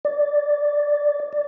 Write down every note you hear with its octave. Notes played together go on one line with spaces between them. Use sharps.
D5
D5